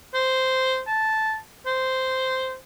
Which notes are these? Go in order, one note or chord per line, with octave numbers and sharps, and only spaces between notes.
C5
A5
C5